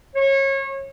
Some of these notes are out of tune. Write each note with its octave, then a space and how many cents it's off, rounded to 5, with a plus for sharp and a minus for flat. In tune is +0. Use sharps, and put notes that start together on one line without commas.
C#5 -30